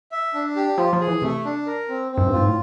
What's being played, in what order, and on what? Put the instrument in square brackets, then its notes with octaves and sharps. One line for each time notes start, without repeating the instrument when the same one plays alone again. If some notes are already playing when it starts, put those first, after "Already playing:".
[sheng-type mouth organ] E5
D4
G4
[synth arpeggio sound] F3 [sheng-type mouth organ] F4
[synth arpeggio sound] F3
[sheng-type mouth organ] G#4
[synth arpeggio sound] E3
[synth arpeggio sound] C3 [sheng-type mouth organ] A3
[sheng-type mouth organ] D4
A#4
C4
C4
[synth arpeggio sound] F#2
G2
[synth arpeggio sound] G#2 [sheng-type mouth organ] F4
[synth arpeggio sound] A2